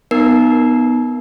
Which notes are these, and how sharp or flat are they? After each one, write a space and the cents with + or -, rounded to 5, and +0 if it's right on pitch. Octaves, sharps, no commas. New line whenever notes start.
B3 +0 D#4 -10 A#4 +0